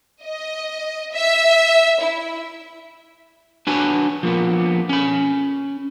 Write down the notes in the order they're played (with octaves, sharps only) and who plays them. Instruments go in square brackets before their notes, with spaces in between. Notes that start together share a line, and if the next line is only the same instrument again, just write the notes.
[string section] D#5
E5
E4
[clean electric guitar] D4 F#4 B4 C#5 G#5
F3 A#3 B3
C#4 B5